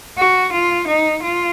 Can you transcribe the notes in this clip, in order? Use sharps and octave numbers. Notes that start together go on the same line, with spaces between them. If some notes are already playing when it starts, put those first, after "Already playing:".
F#4
F4
D#4
F4